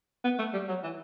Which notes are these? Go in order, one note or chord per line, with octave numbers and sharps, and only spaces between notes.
B3
A3
G3
F#3
E3